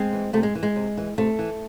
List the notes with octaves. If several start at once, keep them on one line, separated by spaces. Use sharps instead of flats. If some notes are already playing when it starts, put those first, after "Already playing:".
Already playing: G#3 C4
E3
C3 A3
G#3
E3
G#3
C3
E3
C3 A3
E3